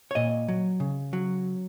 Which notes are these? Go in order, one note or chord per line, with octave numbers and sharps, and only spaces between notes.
C#5
A#2 D#5
F#3
C#3
F#3